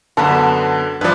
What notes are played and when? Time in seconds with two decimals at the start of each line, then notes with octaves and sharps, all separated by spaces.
0.17 F#2 D3 B3 A5
1.01 G2 F3 B4 D5